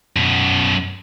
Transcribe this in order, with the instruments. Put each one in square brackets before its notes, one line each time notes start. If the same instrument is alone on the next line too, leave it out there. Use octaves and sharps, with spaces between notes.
[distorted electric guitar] F#2 B2